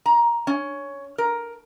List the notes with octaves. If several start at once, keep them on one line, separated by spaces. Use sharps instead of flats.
A#5
C#4
A#4